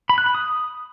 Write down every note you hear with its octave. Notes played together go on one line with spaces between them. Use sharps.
B5
F#6
B5
D#6